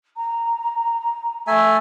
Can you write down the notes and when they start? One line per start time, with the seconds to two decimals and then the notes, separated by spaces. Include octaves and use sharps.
0.17 A#5
1.47 A3 E5 G#5